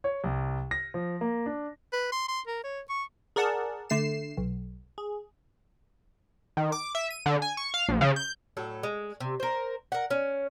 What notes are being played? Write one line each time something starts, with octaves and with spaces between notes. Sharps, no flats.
C#5
C2
A#6
F3
A#3
D4
B4
C6
C6
A#4
C#5
C#6
G#4 A#4 D5 F#5 A5
D3 A3 C7 E7
B1
G#4
D#3
D6
E5
D#7
D3
G#5
C#6
F5
A#1
C#3
G6
A2 F#3 A4
G#3
C3
A#4 C5
A#4 F#5
C#4